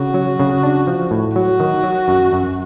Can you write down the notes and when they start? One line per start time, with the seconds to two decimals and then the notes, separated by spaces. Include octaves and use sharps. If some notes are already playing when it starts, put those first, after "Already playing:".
Already playing: C#3 F#4
0.14 F#3
0.40 C#3
0.63 D4
0.87 F3
1.11 A2
1.36 F#3 F#4
1.60 D#3
1.83 F#3
2.08 F#2
2.33 F#2